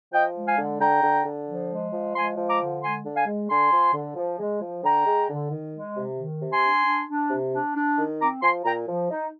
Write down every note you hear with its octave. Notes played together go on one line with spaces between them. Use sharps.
F3 D#5 G5
G#3
F5 G#5
D3
D3 G5 A#5
D3
D3
F3
G#3
F3
G#3 G#5 C6
F3
A#5 D6
D3
G#3 G#5 C6
D3
F5 G#5
G#3
D3 G#5 C6
F3
D3
F3
G#3
F3
D3 G5 A#5
G#3
D3
D#3
G#3
C3
D#3
C3
G#5 C6
D4
D4
D4
C3
D4
D4
D#3
C4 A#5 D6
F3 G#5 C6
A#2 G5 A#5
F3
D#4